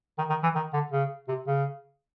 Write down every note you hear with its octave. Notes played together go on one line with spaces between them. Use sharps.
D#3
D#3
E3
D#3
D3
C#3
C3
C#3